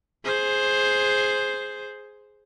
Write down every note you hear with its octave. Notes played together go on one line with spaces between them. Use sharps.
G#4 C5